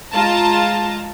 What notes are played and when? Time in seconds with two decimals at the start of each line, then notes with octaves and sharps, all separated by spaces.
0.12 G#3 F4 A5 A#5